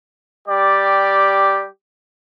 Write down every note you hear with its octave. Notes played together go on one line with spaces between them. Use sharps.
G3 G4 D5